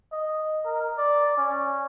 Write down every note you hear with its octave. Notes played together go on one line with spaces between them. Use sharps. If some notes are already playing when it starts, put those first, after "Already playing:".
D#5
A#4
D5
C#4